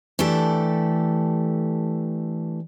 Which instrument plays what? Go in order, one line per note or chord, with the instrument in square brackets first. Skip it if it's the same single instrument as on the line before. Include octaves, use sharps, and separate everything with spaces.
[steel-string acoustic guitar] E3 A3 D4 G4 A4